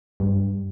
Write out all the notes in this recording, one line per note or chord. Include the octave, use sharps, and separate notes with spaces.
G2